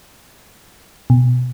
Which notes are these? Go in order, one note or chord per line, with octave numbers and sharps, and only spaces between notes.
B2